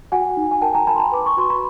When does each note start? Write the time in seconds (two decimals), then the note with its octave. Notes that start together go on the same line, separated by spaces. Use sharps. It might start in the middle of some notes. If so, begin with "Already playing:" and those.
0.12 F#4 F#5 G#5
0.37 D#4
0.51 G#5
0.62 A#4 G5 A5
0.74 G#5 A#5
0.87 A#4 A5 B5
0.96 C6
0.99 A5 B5
1.12 B4 D6
1.26 C#6
1.37 F#4 C6
1.50 B5